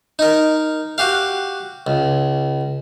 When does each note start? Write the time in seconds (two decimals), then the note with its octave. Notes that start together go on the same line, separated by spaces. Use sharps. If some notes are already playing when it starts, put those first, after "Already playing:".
0.19 D#4 A#4
0.98 F#4 G4 F5
1.87 C#2